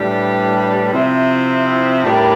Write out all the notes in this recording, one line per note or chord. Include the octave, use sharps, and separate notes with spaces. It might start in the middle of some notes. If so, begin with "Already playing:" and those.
Already playing: A2 E3 G3 D4 G4
C3 F3 C4 E4
A2 G3 D4 G4 A#4